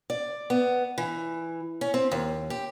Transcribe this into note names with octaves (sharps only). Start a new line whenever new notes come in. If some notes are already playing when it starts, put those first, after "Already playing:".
D5
B3
E3
C#4
C4
D#2
G4